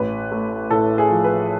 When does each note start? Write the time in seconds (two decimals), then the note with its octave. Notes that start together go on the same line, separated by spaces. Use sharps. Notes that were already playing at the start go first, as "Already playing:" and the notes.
Already playing: A1 B4
0.32 A3
0.70 A2 A4
0.98 G#4
1.10 F3
1.24 B4